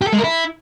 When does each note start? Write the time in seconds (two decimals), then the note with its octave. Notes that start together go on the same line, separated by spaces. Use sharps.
0.01 G4
0.07 A4
0.13 G#3
0.18 A#4
0.24 E4